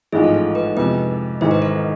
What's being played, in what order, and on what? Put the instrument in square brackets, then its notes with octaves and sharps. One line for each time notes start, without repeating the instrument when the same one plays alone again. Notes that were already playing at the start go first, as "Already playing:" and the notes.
[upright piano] A1 G#2 F3 G#3 [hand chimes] G#4
[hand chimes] A4
A4
B4
[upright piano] F2 C3 G#3 [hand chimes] B4
[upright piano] G#1 G#2 E3 [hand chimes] C5
[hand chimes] B4
A4